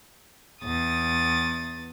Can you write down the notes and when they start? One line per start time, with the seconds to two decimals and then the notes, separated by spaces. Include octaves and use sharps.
0.64 E2 D#6 A6